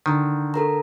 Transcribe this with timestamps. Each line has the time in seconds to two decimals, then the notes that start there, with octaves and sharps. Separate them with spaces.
0.06 D3 D#3
0.54 A4 A#4 A#5